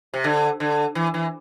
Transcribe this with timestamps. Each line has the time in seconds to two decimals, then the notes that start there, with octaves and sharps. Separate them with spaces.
0.14 C3
0.24 D3
0.60 D3
0.95 E3
1.14 E3